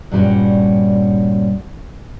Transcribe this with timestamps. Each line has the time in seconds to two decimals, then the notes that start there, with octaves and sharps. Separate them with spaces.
0.11 G2 A#2 G3 C#4 F#4